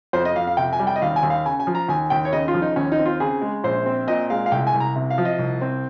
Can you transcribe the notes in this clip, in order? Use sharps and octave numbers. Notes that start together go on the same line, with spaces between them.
F2 C5
D#5
F2 F5
F5
C3 G5
G#5
G3
G5
D#5
D#2 F5
G#5
D#2
F5
C#3 G#5
G#5
F3
A#5
D#2 G#5
D#2 G5
C#5
C#3 D#5
F4
F3
D#4
D#2 C#4
D#4
C4
F4
C#3 G#4
G#3
A#1 C5
C4
A#2 D#5
G#3 F5
F5
C2 G5
G#5
C2
A#5
C3
F5
F3
D#5
C2
C4